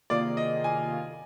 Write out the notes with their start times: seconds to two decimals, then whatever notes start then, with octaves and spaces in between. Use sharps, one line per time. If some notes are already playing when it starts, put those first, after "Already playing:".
0.10 C3 D#3 A#3 F4 G#4 D5
0.37 D#5
0.64 G#5